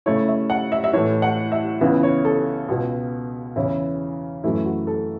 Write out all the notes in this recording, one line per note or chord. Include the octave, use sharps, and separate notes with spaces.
C#3 A3 E4 C#5
E5
F#5
E5
E5
A2 E3 A3 C#5
F#5
E5
C#2 C#3 E3 B3 E4
C#5
A4
C#2 B2 B3
E2 C#3 E3 C#4 E4
F#2 E3 A3 E4
F#4
A4